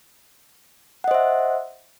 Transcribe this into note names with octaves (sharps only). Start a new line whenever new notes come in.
C5 D#5 E5 F#5